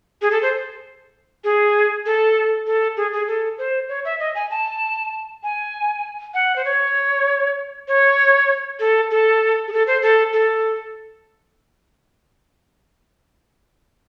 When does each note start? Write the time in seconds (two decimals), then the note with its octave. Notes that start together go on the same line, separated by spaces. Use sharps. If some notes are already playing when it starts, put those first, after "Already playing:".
0.22 G#4
0.31 A4
0.42 C5
1.44 G#4
2.06 A4
2.67 A4
2.97 G#4
3.12 G#4
3.27 A4
3.58 C5
3.89 C#5
4.05 E5
4.20 D#5
4.35 G#5
4.50 A5
5.43 G#5
6.34 F#5
6.56 C5
6.65 C#5
7.88 C#5
8.80 A4
9.11 A4
9.68 G#4
9.72 A4
9.87 C5
10.02 A4
10.33 A4